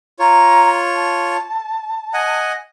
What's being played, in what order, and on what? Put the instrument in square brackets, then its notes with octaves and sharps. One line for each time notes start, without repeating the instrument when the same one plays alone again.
[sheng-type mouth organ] F4 C#5 [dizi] A#5
[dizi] A5
[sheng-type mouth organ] D#5 F#5 G#5